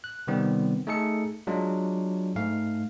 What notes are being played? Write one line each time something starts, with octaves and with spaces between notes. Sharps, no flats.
F#6
C3 D#3 G3 B3 C4
A3 D#4 G#4 A4 C#7
F#3 G#3 D4 F4
G#2 A3 F5